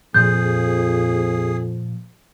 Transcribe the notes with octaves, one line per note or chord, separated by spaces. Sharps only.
F2 A#2 F3 G#4 G6